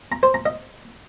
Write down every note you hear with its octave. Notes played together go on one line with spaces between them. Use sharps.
A#5
C5
A#5
D#5